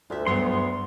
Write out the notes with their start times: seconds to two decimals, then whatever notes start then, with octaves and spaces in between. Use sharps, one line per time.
0.10 D2 F4 E5
0.26 G2 F#3 B3 C6